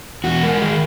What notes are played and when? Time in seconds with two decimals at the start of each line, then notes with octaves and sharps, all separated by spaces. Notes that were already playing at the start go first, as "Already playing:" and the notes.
0.24 E2 F#4
0.43 G#3 A#4
0.62 D#3 G#4